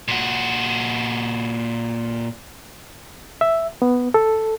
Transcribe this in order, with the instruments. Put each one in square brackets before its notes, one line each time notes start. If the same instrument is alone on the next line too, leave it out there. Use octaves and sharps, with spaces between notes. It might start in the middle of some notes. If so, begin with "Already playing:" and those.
[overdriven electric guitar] A#2 F#4
[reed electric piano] E5
B3
A4